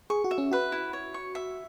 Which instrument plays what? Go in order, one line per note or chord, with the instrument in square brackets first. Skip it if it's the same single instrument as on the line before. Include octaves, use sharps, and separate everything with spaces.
[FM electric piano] G#4 [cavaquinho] C#6
[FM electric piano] F#4
[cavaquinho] E5
[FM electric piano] C#4
[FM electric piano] F#4 [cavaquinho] B4
[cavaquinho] E4
C#5
C#6
E5